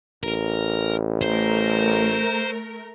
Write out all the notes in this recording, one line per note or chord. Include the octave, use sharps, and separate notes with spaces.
A1 A#4
A3 A#4 C5